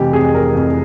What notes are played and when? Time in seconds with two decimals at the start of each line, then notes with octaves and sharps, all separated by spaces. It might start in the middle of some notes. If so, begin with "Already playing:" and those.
Already playing: F1 E3 G4
0.13 F2 G#4
0.34 F2 A#4
0.55 F2